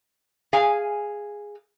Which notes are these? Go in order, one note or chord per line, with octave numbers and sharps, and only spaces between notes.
G#4 F5 G#5